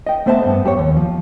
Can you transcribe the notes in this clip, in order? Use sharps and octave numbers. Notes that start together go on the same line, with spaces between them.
D#5 G5
A3 B3 C5 E5 F5 A5
G2 B3
F#2 G4 A4 C#5
D#2
F3